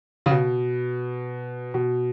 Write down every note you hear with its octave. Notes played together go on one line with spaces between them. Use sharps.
C#3
B2
B2